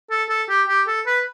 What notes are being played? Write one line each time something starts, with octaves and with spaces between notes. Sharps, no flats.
A4
A4
G4
G4
A4
B4